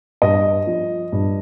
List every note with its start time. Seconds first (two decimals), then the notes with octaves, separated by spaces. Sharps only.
0.22 G2 D#5
0.67 F3
1.12 G2